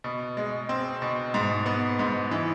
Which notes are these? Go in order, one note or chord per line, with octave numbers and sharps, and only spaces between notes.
B2
G#3
C4
B2
G#2
B3
G#2
E3